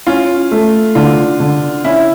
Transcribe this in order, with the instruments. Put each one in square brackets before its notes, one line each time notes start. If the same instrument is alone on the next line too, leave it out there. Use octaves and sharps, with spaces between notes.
[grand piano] C#4 [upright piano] F4
[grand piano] A3
[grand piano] D3 [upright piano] F4
[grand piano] D3
[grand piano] C#4 [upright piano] E4